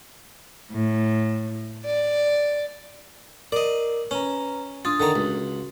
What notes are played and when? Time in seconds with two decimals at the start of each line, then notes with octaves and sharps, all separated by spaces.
0.73 A2
1.89 D5
3.52 A#4 D5 D#5
4.11 C#4 B4 A#5
4.85 D4 F4 D#6 A6
5.00 D3 D#3 A#5
5.16 C#2 F#4